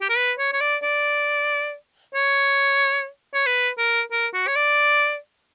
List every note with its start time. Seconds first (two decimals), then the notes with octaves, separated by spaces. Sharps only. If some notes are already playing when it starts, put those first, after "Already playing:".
0.01 G4
0.09 A#4
0.17 B4
0.39 C#5
0.53 C#5
0.61 D5
0.83 D5
2.15 C#5
3.34 C#5
3.46 B4
3.78 A#4
4.11 A#4
4.34 F#4
4.47 C#5
4.55 D5